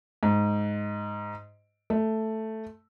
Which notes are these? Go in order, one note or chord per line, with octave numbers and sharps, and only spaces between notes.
G#2
A3